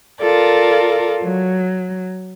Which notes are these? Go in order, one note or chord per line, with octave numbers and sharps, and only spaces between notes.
F4 A4 A#4 D5
F#3